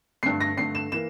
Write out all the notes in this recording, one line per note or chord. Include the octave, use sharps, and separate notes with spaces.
G2 D3 A3 C7
A#6
G2 D3 A3 C7
E7
E3 A#3 E7